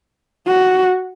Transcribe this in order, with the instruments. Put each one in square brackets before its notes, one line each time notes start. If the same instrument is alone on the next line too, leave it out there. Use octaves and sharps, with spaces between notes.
[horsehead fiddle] F#4